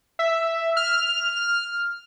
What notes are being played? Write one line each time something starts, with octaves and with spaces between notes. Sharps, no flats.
E5
F6